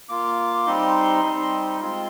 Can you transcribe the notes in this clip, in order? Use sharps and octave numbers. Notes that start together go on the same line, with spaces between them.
A#3 F4 D6
G3 C4 D#4 C6
G3 C4 D#4
G#3 C4 F4